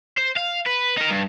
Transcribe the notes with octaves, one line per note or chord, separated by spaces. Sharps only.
C5
F5
B4
D#4 A#4
G2